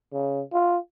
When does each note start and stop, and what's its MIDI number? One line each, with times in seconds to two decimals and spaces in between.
0.13 0.41 49
0.53 0.77 65